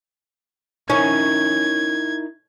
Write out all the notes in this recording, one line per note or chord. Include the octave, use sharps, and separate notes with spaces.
C#4 D#4 E4 A#4 G#6